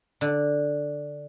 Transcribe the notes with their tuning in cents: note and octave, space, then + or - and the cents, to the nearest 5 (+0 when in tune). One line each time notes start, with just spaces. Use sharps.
D3 +0